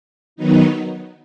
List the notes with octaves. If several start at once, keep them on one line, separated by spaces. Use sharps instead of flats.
D#3 F#3 B3 D#4